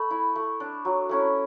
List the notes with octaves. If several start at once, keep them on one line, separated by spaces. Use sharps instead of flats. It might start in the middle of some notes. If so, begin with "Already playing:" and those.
Already playing: A3 B5
E4
A3
D4
F#3
A3 C#4 E4